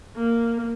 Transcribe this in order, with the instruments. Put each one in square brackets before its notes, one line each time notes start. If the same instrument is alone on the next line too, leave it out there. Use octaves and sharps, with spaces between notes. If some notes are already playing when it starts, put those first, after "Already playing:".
[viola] A#3